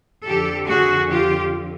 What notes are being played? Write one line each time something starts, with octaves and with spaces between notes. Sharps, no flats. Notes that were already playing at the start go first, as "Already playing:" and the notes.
F2 D3 F3 G4 A4
F#4 G#4
F4 G4